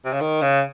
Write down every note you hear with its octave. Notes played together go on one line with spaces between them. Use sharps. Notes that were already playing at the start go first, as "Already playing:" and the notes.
C3
C#3
D#3
C#3